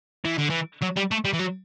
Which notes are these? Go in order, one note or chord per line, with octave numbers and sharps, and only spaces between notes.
E3
D3
E3
F#3
G3
A3
G3
E3
F#3